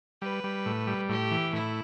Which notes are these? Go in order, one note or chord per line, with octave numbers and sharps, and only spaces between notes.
G3 B4
G3
A2
G3
A2 G4
E3
A2 E4